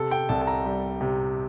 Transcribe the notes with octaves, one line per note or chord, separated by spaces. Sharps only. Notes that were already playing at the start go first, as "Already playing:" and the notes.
Already playing: C3 A4
G5
C2 A5
A5
A#5
G3
C3